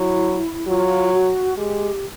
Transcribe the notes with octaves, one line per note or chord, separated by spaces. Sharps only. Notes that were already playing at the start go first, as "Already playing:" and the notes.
Already playing: F#3 E4
F#3 F4
F#4
G#3 G4